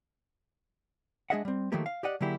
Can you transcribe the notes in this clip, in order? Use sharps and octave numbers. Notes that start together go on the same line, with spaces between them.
G#3 D4 G#4 D#5 E5 F#5
G3 C4
D#3 F3 F#3 A3 A#3 G4
F5
G4 D5 D#5 F#5
D3 F#3 A#3 E4 G4 G#4